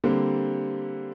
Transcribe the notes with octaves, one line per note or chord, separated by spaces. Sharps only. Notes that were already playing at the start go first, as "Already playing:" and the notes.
D3 G3 A#3 C4